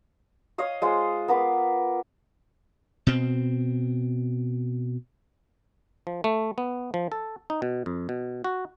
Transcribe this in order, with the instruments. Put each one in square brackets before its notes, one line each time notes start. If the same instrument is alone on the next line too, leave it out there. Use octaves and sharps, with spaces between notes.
[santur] C#5 D#5 F5 D#6
G#3 F4 C5
B3 A#4 B4 D6
[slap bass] B2 C4
[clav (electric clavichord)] F3
A3
B3
F3
A4
D#4
B2
F2
B2
F#4